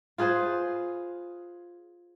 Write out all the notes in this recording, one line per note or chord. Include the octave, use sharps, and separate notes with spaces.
F4 G#4 B4 C5